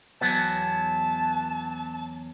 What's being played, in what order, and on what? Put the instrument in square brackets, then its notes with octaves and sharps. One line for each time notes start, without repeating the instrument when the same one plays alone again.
[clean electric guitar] E2 F#3 B3 [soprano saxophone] A5